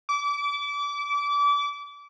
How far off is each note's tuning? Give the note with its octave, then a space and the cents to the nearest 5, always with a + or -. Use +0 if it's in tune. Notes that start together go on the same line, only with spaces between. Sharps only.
D6 -30